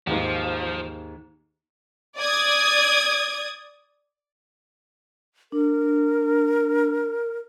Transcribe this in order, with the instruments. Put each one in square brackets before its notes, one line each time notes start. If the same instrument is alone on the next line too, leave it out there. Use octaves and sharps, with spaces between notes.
[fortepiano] D#2 G#2 [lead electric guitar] F3
[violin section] D5 D#6 G#6
[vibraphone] D4 [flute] A#4